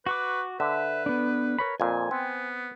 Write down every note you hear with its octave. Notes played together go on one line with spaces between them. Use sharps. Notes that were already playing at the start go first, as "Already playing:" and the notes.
F#4 B4 C#6 D6
D3 B4 E5
B3 D4
A#4 C#5 B5
F2 A#2 G#5
B3 C4